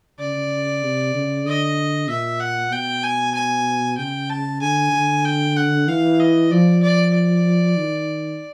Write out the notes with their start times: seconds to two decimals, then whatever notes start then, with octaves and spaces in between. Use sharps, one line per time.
0.19 C#3 D5
0.83 C3
1.14 C#3
1.46 D3 D#5
2.09 A#2 E5
2.40 F#5
2.72 B2 G5
3.03 G#5
3.35 G#5
3.98 C#3 G5
4.30 A5
4.62 D3 G#5
4.93 D3
5.25 G5
5.56 F#5
5.88 E3 F5
6.20 D#5
6.51 F3 D5
6.83 D5
7.13 D5
7.77 D#3